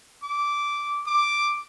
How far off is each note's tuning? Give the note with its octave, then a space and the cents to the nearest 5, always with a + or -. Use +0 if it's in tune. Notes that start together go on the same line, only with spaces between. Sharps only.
D6 -10
D6 +0